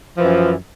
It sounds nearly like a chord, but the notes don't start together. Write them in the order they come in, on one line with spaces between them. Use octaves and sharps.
F3 E3 F#2